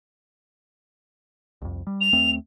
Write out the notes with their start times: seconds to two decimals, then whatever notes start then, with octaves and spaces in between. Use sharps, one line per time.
1.62 C2 F2
1.87 G3
2.00 F7
2.13 D#2 A3 C4